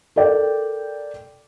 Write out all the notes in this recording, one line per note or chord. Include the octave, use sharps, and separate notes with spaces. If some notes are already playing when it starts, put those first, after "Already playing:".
A4 A#4 D5 G5